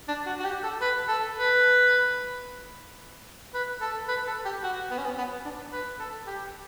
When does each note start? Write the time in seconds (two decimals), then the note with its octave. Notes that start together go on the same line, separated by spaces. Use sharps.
0.08 D4
0.26 F#4
0.40 F#4
0.45 G4
0.63 A4
0.81 B4
1.08 A4
1.36 B4
3.54 B4
3.81 A4
4.08 B4
4.27 A4
4.45 G4
4.63 F#4
4.90 B3
4.98 C#4
5.05 B3
5.18 B3
5.45 D4
5.72 B4
5.99 A4
6.27 G4